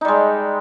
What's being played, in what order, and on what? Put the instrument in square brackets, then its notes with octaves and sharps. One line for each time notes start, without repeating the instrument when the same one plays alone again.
[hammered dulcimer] D#4
G3
G#3